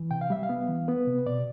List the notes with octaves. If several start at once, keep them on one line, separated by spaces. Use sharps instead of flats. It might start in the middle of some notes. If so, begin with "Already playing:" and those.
Already playing: E3
C3 G5
F5
G3 E5
F5
B3
E3
B3 B4
C3
B2 D5